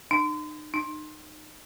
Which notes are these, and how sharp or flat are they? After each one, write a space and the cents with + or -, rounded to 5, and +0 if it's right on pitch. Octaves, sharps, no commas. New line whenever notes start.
D#4 -40
D#4 -25